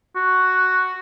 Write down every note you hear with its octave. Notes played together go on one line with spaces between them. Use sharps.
F#4